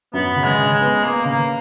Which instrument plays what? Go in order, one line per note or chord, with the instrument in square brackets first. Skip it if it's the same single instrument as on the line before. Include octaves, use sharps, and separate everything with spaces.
[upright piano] F#2 [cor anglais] B3
[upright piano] C#3
[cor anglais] G#3
[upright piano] C#3
[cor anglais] G#3
[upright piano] B3
[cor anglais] A#3 [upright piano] B3
[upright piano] C#3 [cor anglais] A#3